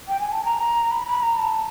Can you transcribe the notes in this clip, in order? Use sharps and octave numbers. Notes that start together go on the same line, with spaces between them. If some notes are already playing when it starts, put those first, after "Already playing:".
G5
G#5
A5
A#5
B5
B5
A#5
A5